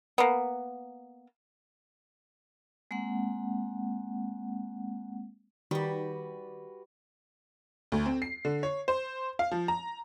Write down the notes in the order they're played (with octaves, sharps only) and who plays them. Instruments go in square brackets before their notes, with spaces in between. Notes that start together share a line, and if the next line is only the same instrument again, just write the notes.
[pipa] A#3 B3
[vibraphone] G#3 A#3 C4 F#5
[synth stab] D#3 [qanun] G3 [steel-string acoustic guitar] F#4 B4
[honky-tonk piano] D2
C4
C7
D3
C#5
C5
F5
F3
A#5